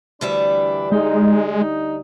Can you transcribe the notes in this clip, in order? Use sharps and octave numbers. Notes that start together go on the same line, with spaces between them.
D2 E3 G3 D4 E5 B5
G#3 D#4
D#4